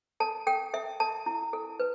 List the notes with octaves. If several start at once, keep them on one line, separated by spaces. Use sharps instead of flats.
A4 A5
A4 G5
A4 E5
A4 A5
E4
A4
B4